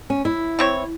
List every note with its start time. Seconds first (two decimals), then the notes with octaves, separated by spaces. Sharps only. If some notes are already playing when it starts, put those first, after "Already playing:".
0.10 C#4
0.25 E4
0.59 E3 C4 C#5